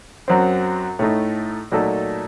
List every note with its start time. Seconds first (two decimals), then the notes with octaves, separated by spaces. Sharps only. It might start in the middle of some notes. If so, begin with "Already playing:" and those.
0.28 F#2 F#3 C4
0.99 A2 A3 D#4
1.72 A#2 F#3 A3 D#4 A4